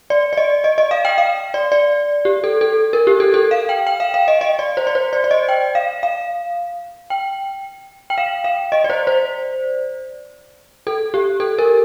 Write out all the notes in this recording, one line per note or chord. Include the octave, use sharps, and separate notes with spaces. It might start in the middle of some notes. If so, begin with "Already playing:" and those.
D5
D5
D#5
D#5
D#5
F5
G5
F5
D5
D5
G4
A4
A4
A#4
G4
A4
A4
F5
G5
G5
F5
F5
D#5
D#5
D5
C5
D5
C5
D5
D5
D#5
G5
F5
F5
G5
G5
F5
F5
D#5
D5
C5
C5
A4
G4
A4
A#4